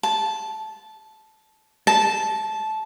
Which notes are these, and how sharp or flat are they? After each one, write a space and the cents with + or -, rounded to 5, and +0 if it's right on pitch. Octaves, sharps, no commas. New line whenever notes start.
A5 -10
A5 -15